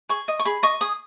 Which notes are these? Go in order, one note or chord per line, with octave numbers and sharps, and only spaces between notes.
G#4 C#6
D#5
C#6
G#4 B5
D#5 C#6
G#4 D#6